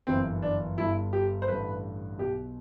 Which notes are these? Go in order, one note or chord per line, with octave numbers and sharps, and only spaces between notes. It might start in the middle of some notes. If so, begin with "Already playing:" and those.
G1 F#2 E3 C4
D4
G1 G2 D3 E4
G4
C5
A1 G2 D3 B4
B1 B2 G4